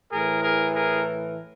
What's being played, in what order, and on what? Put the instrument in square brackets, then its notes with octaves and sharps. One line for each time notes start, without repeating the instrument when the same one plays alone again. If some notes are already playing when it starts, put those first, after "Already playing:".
[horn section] A2 E3 G#4 A#4
G#4 A#4
G#4 A#4